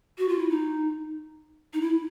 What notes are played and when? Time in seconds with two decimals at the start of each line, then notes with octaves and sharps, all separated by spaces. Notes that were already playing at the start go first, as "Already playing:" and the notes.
0.18 F#4
0.29 F4
0.39 E4
0.49 D#4
1.74 D#4
1.81 E4